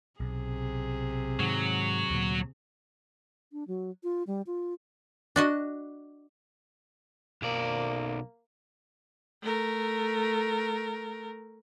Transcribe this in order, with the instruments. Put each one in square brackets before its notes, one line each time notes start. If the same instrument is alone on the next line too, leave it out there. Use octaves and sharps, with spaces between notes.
[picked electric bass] B1 [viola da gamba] C3 G#4
[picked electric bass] G#2 D#3 [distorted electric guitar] F#3
[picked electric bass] D2 A#2
[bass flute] D4
F#3
F4
G3
F4
[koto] D4 F#4 D#5
[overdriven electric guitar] B1 D5 [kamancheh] A#3
[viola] A3 A#4